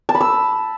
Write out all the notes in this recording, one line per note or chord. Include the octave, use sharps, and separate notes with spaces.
A5
B5
E6